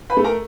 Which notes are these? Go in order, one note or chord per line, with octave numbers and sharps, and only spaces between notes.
B4 B5
A3
A#4 A#5